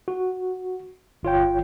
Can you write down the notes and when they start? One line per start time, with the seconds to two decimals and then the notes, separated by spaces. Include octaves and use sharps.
0.08 F#4
1.23 G1 F4 C#5 G5